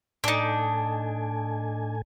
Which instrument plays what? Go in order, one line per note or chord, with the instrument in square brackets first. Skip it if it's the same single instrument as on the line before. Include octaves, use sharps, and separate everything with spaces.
[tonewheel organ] A2 A4 G#5 [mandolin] D4 D#4